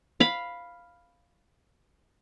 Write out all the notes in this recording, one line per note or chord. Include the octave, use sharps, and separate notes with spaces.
F5 B5